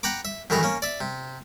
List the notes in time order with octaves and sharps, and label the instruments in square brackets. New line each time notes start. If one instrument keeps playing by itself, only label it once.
[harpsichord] F#5 G5 A#5 B5 D6
E5
F#2 A2 D#3 E3 G#4 A#5
A#3 C#4
D5 E5
C3